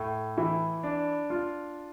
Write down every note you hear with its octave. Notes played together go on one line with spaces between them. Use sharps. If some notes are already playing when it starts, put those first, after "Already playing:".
Already playing: A2
E3
D4
F4